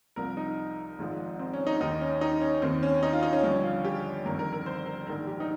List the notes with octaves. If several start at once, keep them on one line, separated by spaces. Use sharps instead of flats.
C2 C3 F3 A#4
D#4
G#1 G#2 F3
C4
C#4
D#4
D#2 D#3 D#4
C#4
D#4
C#4
D#2 D#3 C4
C#4
D#4
F4
D#4
C#4
G1 G2 F3 C#4
F4
G4
G1 F2 D#3 A#4
A#4
A#4
C5
A#4
A#1 G#2 D#3 A#4
G4
D#4